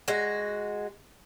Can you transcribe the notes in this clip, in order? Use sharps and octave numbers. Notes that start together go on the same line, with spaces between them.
G#3 F#4